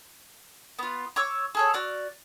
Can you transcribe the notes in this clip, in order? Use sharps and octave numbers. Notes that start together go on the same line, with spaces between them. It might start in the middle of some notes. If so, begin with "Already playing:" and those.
B3 F4
C#5 C#6 D6 E6
G#4 A4 C#5
F#4 D5 F6